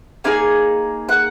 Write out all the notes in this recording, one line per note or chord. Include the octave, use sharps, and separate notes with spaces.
A#3 D#4 G#4 G#5
F#5